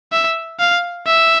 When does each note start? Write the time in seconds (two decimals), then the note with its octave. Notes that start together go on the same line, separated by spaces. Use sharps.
0.12 E5
0.60 F5
1.06 E5